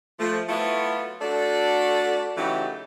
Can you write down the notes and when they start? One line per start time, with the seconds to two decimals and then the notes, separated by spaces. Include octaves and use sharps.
0.19 F3 A3
0.49 F#3 A3 B3 E4 F4
1.22 A3 D4 F#4 A4 D5
2.37 C#3 E3 F#3 A3 D#4 G4